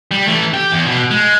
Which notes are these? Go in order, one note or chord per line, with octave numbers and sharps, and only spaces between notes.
G3
E3 A3
G4
E2
B2
G#3